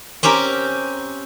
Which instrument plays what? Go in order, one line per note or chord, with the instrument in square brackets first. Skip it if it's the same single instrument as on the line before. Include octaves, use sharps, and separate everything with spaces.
[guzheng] C4 C#4 G4 A#4 A#5